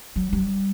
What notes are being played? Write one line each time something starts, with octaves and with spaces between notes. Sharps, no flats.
F#3
G3